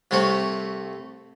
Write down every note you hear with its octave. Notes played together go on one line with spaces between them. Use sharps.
C2 C3 A3 C4 C#5